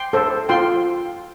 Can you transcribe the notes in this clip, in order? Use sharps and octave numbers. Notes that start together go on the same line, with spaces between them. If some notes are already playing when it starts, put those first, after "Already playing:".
Already playing: G5 C6
A4 C5
F4 G5 C6